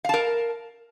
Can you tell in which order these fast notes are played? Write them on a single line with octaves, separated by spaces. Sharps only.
F5 A5 A#4